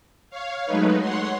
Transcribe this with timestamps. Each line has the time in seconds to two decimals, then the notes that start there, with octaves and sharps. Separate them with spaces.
0.30 C#5 F5
0.66 F#3 G#3 A3 D#4 B4
1.00 C#5 F#5 C6